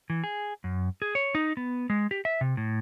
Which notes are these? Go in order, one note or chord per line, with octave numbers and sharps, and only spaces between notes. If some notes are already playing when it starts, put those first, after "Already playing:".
E3
G#4
F#2
G#4
C#5
D#4
B3
G#3
G4
E5
C3
A2